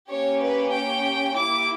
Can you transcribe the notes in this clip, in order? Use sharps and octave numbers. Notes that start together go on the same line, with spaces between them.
A#3 C#4 G4 C#5
B4
G5
A#3 E4 G4 D6